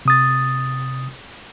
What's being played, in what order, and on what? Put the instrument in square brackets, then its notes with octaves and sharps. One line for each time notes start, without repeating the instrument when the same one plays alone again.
[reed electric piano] C3 D#6 A6